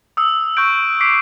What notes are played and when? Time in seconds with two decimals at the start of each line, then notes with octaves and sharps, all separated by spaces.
0.17 D#6 E6
0.57 C#6 E6 F#6 G6 D7
1.00 D6 B6 C7 D7